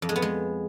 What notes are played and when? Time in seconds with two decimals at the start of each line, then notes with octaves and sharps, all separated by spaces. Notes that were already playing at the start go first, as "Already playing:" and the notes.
0.02 F2
0.09 G#3
0.16 B3
0.22 G#3